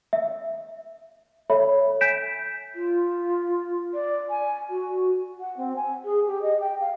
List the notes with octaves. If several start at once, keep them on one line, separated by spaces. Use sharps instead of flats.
E5
A4 C#5 E5 B5
G#5 G6 B6 D7 E7
F4
D5
G#5
F#4
F#5
C4
G#5
G#4
G4
D#5
G5
F5